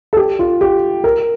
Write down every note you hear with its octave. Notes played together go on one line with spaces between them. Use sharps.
A4
G4
F4
G4
A#4